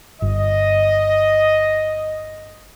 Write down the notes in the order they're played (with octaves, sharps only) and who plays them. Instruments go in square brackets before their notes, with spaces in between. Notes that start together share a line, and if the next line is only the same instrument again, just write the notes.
[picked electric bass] G1 [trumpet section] D#5